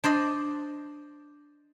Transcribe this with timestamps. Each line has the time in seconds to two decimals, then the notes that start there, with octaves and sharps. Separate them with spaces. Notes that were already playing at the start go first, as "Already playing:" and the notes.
0.04 D4 C5 D5 D#5